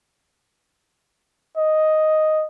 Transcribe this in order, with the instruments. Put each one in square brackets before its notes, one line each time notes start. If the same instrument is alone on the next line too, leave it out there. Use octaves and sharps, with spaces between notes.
[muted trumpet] D#5